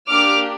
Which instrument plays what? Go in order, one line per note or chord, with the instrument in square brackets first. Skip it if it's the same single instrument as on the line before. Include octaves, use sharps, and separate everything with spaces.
[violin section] A#3 D4 G4 D6 F6